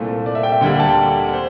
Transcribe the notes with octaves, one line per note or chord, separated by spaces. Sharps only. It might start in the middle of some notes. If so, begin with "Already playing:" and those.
Already playing: C2 A#2 A3 C5
D5
E5
G5
E5
D2 D3 G3 A#3 G5
A5
G5
D5
C5